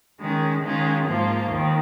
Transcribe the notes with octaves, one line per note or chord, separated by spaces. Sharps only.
D#3 G#3 C#4
D#3 G#3 C#4 F4
G#2 F3 A#3 F4
D#2 D#3